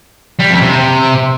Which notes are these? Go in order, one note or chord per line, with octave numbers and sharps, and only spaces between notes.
G3
F2
C3